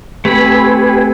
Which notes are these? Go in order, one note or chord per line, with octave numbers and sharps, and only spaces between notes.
A3 C4 G4 B4 G#5 B5